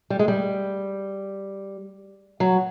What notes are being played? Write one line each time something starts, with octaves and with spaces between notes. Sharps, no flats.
G3
G#3
G3
F#3